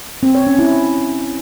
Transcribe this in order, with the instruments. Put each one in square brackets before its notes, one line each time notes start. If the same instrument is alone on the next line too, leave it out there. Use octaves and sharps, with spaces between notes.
[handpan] C4
C#5
C#4
E4